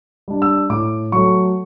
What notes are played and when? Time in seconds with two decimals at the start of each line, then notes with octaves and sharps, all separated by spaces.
0.28 G3 D4
0.42 E6
0.70 A2 D6
1.12 F#3 A3 C#6